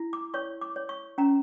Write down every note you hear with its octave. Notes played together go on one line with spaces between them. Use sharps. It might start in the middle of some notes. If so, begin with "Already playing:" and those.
Already playing: E4
D6
C#5 C#6
D6
C#5
C#6
C#4 A#5